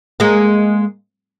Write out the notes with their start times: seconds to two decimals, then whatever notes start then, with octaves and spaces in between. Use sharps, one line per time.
0.20 G#3 A#3